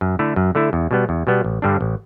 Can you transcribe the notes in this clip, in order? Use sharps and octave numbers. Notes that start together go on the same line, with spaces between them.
F#2
D3 A3 E4
F#2
D3 A3 E4
E2
B2 G3 B3
E2
B2 G3 B3
A1
G2 D3 G3 D4
A1